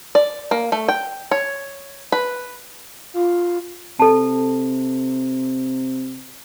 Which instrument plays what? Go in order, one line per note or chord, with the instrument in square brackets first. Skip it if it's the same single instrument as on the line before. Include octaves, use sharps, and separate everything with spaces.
[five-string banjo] D5
A#3
A3
G5
C#5
B4
[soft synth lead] F4
[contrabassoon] C3 [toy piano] A4 A5